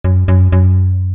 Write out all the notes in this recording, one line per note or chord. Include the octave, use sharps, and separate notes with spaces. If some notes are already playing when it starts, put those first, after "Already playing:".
F#2
F#2
F#2